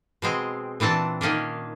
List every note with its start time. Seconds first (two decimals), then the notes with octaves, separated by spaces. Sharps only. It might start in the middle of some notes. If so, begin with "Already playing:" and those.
0.22 B2 G#3 C4
0.80 A#2 E3 C4 D4 A5
1.21 D#3 A#3 C#4 D4